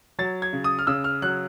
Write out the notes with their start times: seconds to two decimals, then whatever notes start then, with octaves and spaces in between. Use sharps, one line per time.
0.19 F#3 A6
0.42 G#6
0.53 C#3
0.64 D#6
0.79 F6
0.87 C#3 E6
1.04 F6
1.22 F#3 F#6